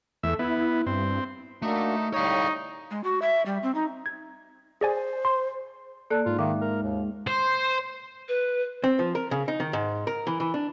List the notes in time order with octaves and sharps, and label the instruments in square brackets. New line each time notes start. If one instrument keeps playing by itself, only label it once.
[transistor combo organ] E2 E5 [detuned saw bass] A3
[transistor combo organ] B3 [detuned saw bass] E4
[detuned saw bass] G2 [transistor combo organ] C4
[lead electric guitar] A3 [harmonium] A#3 D4 F#4 [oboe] D#4
[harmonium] A2 G3 [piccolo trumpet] D#4 [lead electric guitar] C#5 F5 [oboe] C#6
[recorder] G#3
F#4
E5
G3
C4
D#4
[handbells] G#6
[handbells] G#4 D5 G#5 [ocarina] C5
[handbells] C6
[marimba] A#3 D5 F#6 [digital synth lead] A4
[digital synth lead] G#2 [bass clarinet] F4
[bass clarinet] D#3 [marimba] E5 F5 D6
[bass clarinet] A#4
D#2
[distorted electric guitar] C5
[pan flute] B4
[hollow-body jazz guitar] C4
F3
A#4
C#3
D#4
D#3
G#2
A#4
E3
E3
D4